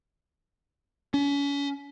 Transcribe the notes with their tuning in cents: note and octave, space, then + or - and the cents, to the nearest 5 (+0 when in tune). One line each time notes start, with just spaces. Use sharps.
C#4 +35